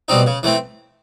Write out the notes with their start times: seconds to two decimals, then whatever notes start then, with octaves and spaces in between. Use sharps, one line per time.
0.08 B2 G3 C4 D#4
0.27 C#3
0.43 E3 A3 C4